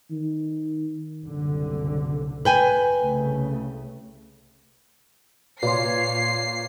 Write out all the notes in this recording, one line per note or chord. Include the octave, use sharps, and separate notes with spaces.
D#3
F#1 C2 D3
B4 G5 G#5
C2 C#3 A3
A#2 B4 C#5 C6 C7